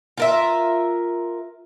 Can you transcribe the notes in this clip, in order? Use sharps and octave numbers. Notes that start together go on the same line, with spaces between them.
F4 A#4 E5